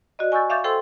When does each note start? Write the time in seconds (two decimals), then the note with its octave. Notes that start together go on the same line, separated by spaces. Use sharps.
0.19 F#4 D5 D#5
0.32 G#5 C#6 E6 G6 A6
0.50 E5 F5 C#6 D6 G6 A6
0.64 A4 C5 G5 C6 E6